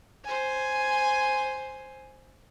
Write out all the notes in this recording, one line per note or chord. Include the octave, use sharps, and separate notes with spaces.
C5 G#5